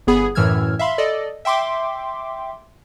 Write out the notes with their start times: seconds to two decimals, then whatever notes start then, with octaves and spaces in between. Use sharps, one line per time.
0.07 G1 B3 G#4 B5
0.35 F#2 A2 E3 E6 F6 G#6
0.79 E5 F5 B5 C6
0.98 A4 D5 D#5
1.45 E5 G5 C6 D6